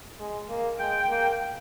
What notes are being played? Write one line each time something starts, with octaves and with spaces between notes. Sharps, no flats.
G#3
A#3
G#3 G5
A#3